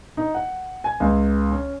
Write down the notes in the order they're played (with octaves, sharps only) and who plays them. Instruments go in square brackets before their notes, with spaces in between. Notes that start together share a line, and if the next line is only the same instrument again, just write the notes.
[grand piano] D#4
F#5
G#5
C#2
C#4